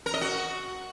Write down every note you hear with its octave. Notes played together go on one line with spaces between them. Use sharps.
A#4
D#5
F#4